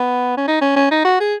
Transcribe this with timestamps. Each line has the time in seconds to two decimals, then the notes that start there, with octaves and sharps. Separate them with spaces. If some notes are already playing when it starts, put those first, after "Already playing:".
Already playing: B3
0.37 C#4
0.48 D#4
0.61 C#4
0.76 C#4
0.91 D#4
1.05 F#4
1.20 G#4